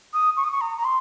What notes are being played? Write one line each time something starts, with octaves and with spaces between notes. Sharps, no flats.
D#6
C#6
D#6
C#6
A#5
A#5
C6